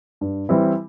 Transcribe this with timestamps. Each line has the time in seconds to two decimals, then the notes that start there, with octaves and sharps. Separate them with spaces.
0.21 G2
0.49 E3 G3 C4 E4